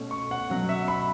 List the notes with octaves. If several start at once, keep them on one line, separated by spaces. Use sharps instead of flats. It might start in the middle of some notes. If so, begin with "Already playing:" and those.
Already playing: B2 A3 C#4
C#6
F#5
B2 F#3 C#4 F#5
E5
B5